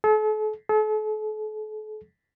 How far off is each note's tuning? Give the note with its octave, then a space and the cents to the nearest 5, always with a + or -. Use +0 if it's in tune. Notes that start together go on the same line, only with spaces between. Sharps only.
A4 -40
A4 -40